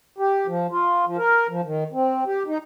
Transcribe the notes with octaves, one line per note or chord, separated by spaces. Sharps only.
G4
F3
F4
F3
A#4
F3
D#3
C4
G4
D#4